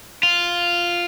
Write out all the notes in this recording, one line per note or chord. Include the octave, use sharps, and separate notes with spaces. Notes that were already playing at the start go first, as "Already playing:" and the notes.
F4